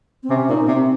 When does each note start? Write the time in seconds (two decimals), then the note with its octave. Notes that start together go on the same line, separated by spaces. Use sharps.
0.23 C4
0.30 C3 C#4
0.49 A#2 D#4
0.68 C3 C4